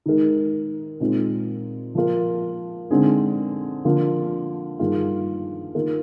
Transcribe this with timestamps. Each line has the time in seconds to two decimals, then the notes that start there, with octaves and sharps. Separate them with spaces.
0.06 D#3 G#3 D#4 A#4
1.00 A#2 G#3 C4 D#4
1.95 F3 A#3 F4 A#4
2.91 D3 G#3 C4 D#4 G#4
3.85 D3 F3 A#3 F4
4.79 G2 D#3 A#3 F4 G#4
5.75 D#3 A#3 F4 A#4